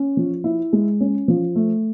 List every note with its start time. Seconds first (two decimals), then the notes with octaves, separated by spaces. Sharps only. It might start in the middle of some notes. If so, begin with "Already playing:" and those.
Already playing: C#4
0.17 F3
0.44 E4
0.73 G#3
1.01 C#4
1.28 F3
1.56 A3